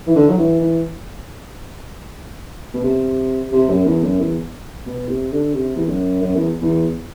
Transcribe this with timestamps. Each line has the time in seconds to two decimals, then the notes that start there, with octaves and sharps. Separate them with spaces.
0.07 E3
0.15 D3
0.29 F#3
0.38 E3
0.60 E3
2.74 B2
2.84 C3
3.52 C3
3.69 F#2
3.85 E2
4.03 F#2
4.19 E2
4.86 B2
5.08 C3
5.32 D3
5.54 C3
5.76 E2
5.88 F#2
6.22 F#2
6.35 E2
6.62 E2